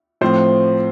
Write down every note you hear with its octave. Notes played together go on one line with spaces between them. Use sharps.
A2 F3 C4 C5